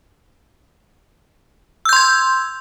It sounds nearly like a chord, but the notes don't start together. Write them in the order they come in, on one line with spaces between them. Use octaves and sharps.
E6 G6 C6 G#6